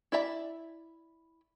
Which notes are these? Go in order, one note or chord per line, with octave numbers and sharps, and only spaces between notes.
E4 D5 E5 A#5 B5